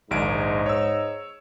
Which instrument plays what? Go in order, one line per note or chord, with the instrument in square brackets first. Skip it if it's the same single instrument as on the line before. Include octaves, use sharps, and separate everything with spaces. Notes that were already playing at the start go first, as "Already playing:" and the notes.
[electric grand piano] A#1 D#2 D7 [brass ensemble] G#2 D#4
[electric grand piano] C#5 E6